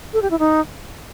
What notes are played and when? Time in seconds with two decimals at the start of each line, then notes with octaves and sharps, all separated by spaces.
0.14 A4
0.22 G4
0.31 E4
0.39 D#4